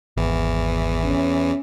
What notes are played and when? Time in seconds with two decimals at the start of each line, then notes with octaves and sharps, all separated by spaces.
0.17 G#1 E2 E3
1.03 C#4